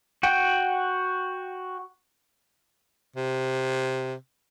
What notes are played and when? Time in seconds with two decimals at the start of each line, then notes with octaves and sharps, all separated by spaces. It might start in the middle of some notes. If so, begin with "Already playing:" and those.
0.23 F#4 F#5 G5
3.16 C3